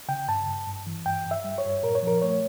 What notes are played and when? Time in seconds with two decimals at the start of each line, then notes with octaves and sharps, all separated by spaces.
0.08 C#3 G5
0.28 G2 A5
0.48 G2
0.67 G2
0.87 E3
1.05 G2 G5
1.26 G2
1.31 E5
1.44 G3
1.58 C#5
1.65 G2
1.83 A#2 A#4
1.95 C#5
2.03 F3 A#4
2.22 A3 C#5